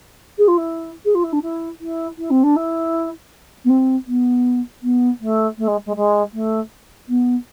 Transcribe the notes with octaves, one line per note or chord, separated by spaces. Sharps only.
G#4
F4
E4
G#4
F4
E4
D4
E4
E4
E4
C4
D4
E4
B3
C4
B3
B3
A3
A3
G#3
G#3
G#3
A3
B3